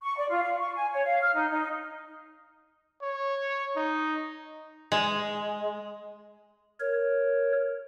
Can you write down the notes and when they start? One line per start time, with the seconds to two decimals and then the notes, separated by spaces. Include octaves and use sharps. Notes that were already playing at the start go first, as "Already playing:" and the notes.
0.02 C#6
0.17 D5
0.29 F4
0.42 F5
0.59 C#6
0.75 G#5
0.92 C#5
1.05 F5
1.21 F6
1.34 D#4
1.51 D#4
3.02 C#5
3.76 D#4
4.92 G#3
6.80 A#4 C#5